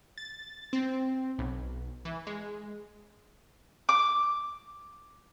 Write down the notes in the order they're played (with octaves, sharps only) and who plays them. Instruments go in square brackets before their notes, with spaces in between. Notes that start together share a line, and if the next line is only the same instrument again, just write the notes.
[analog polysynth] A6
C4
B1
E3
G#3
[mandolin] D6